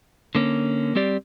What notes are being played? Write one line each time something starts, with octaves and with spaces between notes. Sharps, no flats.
D3 A#3 C#4
G3 C4 G4 D5